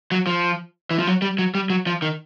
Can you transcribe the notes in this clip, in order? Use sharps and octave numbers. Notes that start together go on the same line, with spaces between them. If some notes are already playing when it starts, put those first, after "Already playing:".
F#3
F3
E3
F3
F#3
G3
F#3
G3
F#3
F3
D#3